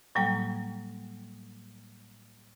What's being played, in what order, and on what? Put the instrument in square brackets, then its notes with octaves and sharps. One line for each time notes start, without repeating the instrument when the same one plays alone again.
[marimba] A2 F#3 G3 A#3 G5